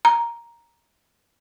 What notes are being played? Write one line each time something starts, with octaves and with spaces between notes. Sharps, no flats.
A#5